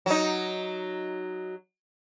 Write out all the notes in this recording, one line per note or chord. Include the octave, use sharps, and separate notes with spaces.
F#3 D#4